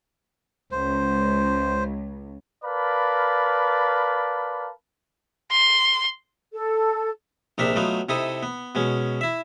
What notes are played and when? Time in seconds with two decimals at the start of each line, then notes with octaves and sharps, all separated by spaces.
0.71 C#2 C5
2.65 A#4 B4 D5 F5 A5 B5
5.51 C6
6.53 A4
7.58 A#1 C3 D4 D#4 A#4 E5
7.76 F#3 A3 B3 D#4 F4
8.09 C3 D#4 E4 A4 D#6
8.43 B3
8.75 B2 G#3 C#4
9.21 E4 E5